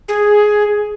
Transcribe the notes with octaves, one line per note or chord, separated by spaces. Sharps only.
G#4